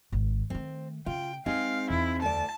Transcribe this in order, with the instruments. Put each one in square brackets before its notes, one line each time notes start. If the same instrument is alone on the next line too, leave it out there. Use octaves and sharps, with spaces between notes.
[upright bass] G#1 D#3
[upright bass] D#3 A3 [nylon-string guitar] C4
[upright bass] C#3 [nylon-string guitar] F4 [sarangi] G5
[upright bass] G#3 [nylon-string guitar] C4 D#4 G#4 [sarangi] F5
[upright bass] E2 [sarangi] E4
[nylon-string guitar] D2 D5 [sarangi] A5